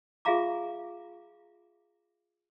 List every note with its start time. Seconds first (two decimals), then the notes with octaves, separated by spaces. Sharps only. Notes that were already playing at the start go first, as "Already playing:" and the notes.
0.25 F4 G#4 E5 F5 A#5 D6